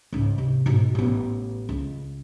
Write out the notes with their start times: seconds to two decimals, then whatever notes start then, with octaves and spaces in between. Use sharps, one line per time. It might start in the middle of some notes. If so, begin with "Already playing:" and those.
0.13 C#2 G#2
0.38 C3
0.66 G#2 B2
0.95 A1 B3
1.69 C#2